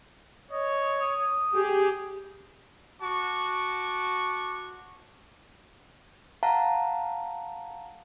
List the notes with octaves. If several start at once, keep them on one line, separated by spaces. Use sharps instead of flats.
C#5 D#5
D#6
G4 G#4
F#4 A5 C#6 D6
F5 F#5 A5 A#5